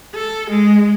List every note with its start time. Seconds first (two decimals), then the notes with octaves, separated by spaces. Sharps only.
0.15 A4
0.50 G#3